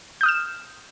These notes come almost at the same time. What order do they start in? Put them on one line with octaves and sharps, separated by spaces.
G6 D#6 F6 E7